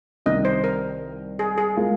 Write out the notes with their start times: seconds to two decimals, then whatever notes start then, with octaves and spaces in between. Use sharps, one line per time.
0.26 C2 C3 D#3 D#5
0.45 C5
0.64 A#4
1.39 G#4
1.58 G#4
1.77 G#3 F4 A#4